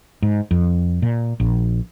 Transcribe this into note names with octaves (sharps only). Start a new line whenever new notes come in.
G#2
F2
A#2
A#1